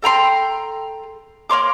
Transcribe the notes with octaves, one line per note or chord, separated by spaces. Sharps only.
A4 G5 A#5 C6
A#3 C#5 C6 D6